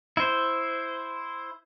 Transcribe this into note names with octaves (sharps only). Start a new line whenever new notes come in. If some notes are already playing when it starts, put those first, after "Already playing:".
E4 C5